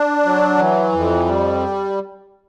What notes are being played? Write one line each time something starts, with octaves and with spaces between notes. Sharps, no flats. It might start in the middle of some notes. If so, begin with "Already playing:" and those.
Already playing: D4
F#3
E3
F2
G3